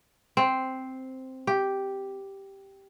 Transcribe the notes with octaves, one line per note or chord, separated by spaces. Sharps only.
C4
G4